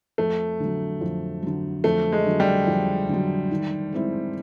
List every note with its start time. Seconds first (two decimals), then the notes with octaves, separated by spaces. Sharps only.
0.18 F2 A3
0.60 D3 F#3
1.01 F2
1.43 D3 F#3
1.84 F2 A3
2.12 G#3
2.27 D3 F#3
2.40 G3
2.67 F2
3.09 D3 F#3
3.51 D#3
3.92 G#3 C4 E4